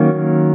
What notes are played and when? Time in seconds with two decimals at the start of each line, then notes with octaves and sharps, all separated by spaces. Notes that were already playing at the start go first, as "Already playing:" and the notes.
Already playing: D#3 F#3 A#3 C#4